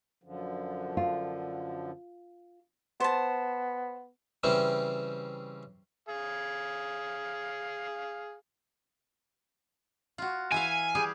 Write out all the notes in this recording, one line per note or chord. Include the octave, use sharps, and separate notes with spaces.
F#2 D3 F3
F4
B3 C5 A5
C#3 E3 G3 C4 C#4
G#4 F5
F4 F#4
E3 E5 F5 G#5
G3 G4 G#4